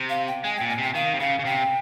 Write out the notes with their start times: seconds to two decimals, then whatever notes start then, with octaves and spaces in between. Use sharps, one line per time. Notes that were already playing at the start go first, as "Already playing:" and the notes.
Already playing: C3
0.09 F5
0.27 G5
0.44 G#3 G#5
0.57 A#2 G5
0.69 G#5
0.78 C3 G5
0.94 D#3 F5
1.14 C3
1.19 C#3 F5
1.39 C#3
1.45 C3 G5